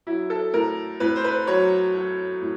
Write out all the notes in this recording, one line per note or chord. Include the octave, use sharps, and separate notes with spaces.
F#3 E4
A4
A2 A#4
A2 B4
C5
B4
F#3 C#5
F#3
A2